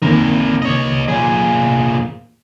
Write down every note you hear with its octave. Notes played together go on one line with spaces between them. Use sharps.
D#3 A#3 C4 A#4
C#5 D#5
A#2 G#4